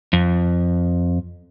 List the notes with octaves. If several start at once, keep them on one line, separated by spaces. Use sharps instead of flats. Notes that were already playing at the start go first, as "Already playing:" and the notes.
F2